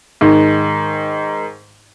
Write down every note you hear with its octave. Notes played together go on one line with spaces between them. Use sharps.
G#2 D#3 D#4